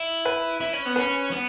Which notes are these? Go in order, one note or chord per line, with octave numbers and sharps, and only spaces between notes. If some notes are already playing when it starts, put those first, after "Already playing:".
Already playing: E4
B4
E4
C#4
B3
C#4 B4
B3